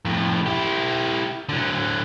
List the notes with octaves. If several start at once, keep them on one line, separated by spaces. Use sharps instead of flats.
F2 A2
E4 G4
D3 F#3